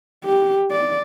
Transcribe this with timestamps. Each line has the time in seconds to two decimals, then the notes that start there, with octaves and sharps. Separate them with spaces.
0.25 G4
0.71 D5